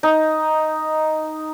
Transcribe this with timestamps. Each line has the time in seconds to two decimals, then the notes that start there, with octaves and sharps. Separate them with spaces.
0.03 D#4